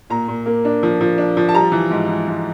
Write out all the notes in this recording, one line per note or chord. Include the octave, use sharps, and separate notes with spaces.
A#2 A#5
A#2
A#3
D4
F3
F3
D4
F3
A5
G3 A#5
E3
G#2
E3
G#2